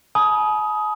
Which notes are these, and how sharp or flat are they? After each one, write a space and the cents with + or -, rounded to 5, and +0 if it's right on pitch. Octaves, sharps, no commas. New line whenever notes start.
G#5 +45 B5 -45 D#6 +15